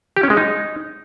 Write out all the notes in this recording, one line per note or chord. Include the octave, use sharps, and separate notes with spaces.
G4
C#4
G#3
D#4